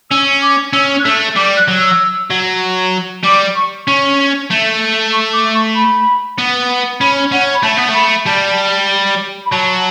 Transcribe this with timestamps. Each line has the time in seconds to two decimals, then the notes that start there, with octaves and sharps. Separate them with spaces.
0.11 C#4 E6
0.42 D6
0.73 C#4 E6
1.00 F#6
1.04 A3 E6
1.36 G3 D6
1.57 F#6
1.68 F#3
1.78 E6
2.30 F#3
3.24 G3 D6
3.56 C#6
3.87 C#4 C#6
4.50 A3
5.12 C#6
5.33 D6
5.54 C#6
5.75 B5
6.38 B3
7.00 C#4 B5
7.32 C#4 F#5
7.54 B5
7.63 A3 A5
7.77 B3
7.89 A3
7.94 B5
8.26 G3 A5
9.46 B5
9.52 F#3 A5